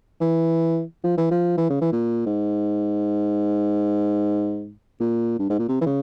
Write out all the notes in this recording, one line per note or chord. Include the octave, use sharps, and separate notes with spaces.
E3
F3
E3
F3
E3
C#3
E3
A#2
G#2
A#2
G2
G#2
A#2
C3
E3
C#3